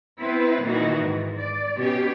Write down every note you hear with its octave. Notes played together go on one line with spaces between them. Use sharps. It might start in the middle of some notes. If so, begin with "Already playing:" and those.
B3 C4 E4 B4 C5
A#2 D#3 E3 D#4 F#4
G#2
D5
B2 C#4 G4